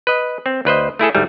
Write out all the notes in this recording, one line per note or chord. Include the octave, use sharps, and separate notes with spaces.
B4 D#5
C4
D2 B4 C5 D#5
A3 E4 G#4 A4
D2 G#2 G3 A3